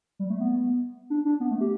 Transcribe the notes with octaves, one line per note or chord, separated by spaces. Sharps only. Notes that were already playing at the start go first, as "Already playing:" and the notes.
G3
A3
B3
D4
D4
B3
A3
G4